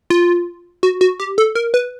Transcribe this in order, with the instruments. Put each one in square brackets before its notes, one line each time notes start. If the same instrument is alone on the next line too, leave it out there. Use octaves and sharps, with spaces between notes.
[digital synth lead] F4
F#4
F#4
G4
A4
A#4
B4